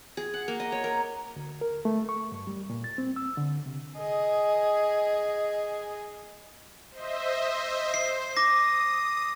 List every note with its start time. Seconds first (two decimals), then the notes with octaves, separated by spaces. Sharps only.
0.17 G#4
0.34 F#5
0.48 A#3
0.60 D#5
0.72 C#5
0.84 A#4
1.36 D2
1.61 A#4
1.85 A3
2.09 C#6
2.32 G2
2.47 G3
2.70 A#2
2.84 A6
2.98 C4
3.16 E6
3.37 D3
3.66 C3
3.97 G#4 D#5
6.91 C5 D#5 E5
7.94 C5 C7
8.37 D6 D#6 A#6